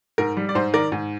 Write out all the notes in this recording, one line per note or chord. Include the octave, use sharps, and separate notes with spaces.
G#2 A#4
G3
D5
G#2 C5
D#3 A#4 D5
G#2